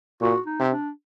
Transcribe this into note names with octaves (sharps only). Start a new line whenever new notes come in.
A#2 F#4
D#4
C3
D4